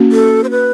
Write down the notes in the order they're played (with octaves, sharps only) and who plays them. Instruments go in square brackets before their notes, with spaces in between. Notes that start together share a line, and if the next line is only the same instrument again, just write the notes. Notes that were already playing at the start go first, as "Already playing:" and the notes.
Already playing: [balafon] A#3 C#4 F#4
[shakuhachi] A4
C5
B4